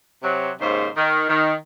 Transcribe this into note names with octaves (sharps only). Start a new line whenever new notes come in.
C3 F#3
D#2 G#2 C#3 C5
D#3
D#3